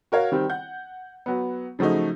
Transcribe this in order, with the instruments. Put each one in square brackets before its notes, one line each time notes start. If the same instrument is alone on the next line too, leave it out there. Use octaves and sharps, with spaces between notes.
[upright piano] F#4 A#4 C#5 F5
D#3 G3 C4
F#5 G6
F#3 B3
C#3 F3 F#3 A3 D#4